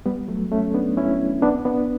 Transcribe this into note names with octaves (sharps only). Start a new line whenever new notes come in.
G3 B3
F#3 A3
A3 C#4
B3 D4
C#4 E4
B3 D4
B3 D4